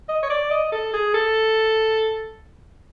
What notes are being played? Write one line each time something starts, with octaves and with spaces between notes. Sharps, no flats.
D#5
C#5
D5
D#5
A4
G#4
A4